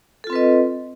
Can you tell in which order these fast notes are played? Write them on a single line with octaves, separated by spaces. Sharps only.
A4 F4 C4 B4 D#5